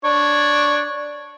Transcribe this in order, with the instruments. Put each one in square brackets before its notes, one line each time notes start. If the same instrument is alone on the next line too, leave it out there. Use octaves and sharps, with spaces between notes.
[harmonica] D4 C#5